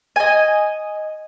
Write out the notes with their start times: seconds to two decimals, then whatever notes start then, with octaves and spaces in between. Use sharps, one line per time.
0.16 D#5 G#5